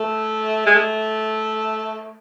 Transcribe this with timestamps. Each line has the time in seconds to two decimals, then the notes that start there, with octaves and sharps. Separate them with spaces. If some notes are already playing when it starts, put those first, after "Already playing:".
Already playing: A3
0.66 G#3
0.75 A3